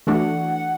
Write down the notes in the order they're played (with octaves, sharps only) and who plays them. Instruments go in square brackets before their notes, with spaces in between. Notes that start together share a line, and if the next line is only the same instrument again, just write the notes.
[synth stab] E3 A3 D4 F#4 [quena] F#5